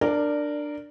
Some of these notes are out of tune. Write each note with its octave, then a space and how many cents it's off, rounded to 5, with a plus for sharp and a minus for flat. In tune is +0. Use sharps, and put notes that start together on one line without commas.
D4 +15 A#4 -10 D5 +0